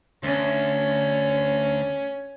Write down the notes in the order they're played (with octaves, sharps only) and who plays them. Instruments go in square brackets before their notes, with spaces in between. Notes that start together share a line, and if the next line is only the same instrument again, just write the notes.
[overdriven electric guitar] D2 [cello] C#4